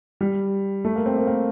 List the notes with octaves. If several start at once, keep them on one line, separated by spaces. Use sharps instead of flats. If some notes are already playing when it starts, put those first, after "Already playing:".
G3
A3
A#3
C4
A#3
A#3